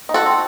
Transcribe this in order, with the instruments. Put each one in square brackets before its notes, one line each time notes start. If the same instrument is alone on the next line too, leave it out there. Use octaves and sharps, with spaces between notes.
[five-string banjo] D#4
F#4 A4
C4